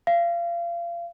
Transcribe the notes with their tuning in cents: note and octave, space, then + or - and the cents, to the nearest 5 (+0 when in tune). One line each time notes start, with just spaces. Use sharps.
F5 -30